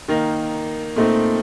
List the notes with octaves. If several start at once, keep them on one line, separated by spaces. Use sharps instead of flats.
D#3 A#3 D#4
A#2 A3 C4 D#4